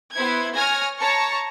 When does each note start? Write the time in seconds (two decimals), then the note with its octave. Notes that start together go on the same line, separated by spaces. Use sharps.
0.15 B3 E4 C5 G#6
0.55 C#5 G#5 F6 G#6 A#6
0.98 C#5 A5 A#5 C#6